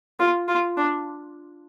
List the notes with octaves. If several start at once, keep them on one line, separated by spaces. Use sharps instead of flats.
F4
F4
D4